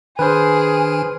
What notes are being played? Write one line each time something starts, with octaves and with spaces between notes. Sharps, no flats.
D#3 D4 G#4 B4 C5 F6